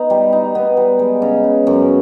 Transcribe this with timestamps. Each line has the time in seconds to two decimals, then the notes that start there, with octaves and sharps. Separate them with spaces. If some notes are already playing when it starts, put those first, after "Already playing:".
Already playing: B3 D#4
0.10 G3
0.33 D#4
0.55 B3
0.77 G3
0.99 G#3
1.22 C#3
1.44 C#3
1.67 F#2